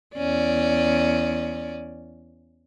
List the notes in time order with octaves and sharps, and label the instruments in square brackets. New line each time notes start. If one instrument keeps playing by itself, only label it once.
[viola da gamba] E2 C#4 D5